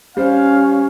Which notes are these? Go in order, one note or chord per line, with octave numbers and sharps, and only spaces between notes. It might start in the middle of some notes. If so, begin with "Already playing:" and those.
G3 C#4 C5 F5